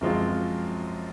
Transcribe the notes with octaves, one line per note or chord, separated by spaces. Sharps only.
F#2 F3 G#3 C4 F4